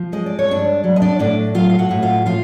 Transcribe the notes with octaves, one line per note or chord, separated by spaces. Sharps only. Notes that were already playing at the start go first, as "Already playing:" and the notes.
Already playing: F3
G#3 D#5
D5
C#5
G2 D4 D5
F#3
D#5
D4 D5
A2 D4 D5
F#3 F4 F5
F5
F#4 F#5
A2
F4 F5
F3 F4 F5